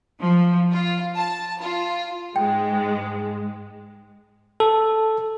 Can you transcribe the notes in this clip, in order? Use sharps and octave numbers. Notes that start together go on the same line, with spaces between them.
F3
F4
A5
F4
G#2 G#3 G5
A4